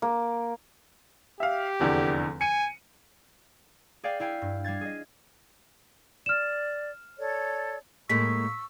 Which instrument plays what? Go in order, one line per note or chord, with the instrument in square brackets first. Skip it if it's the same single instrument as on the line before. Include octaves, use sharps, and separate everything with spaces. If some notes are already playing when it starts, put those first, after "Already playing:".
[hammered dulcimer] A#3
[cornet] G4 [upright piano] E5 F5
[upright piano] F1 E2 D3
[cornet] G#5 [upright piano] C#7 D#7
[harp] G#4 D5 F5 G5
E4 F5 G5 G#5
G2
G3 F5 G#6 A6
G#4 D#5
[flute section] D5 [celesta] F6 E7
[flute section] A4 C#5 D5
[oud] A2 G#3 A#3 [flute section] C#6 E6 [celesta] B6